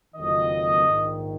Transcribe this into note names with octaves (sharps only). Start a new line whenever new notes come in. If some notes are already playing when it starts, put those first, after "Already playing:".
F#1 F2 D#3 D#5
A#1 G#2 D#3